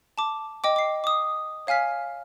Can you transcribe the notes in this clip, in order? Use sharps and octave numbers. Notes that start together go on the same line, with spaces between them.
A5 D6
D#5 G5 D6
D6 C7
D6 D#6
C#5 F5 G#5 F6 B6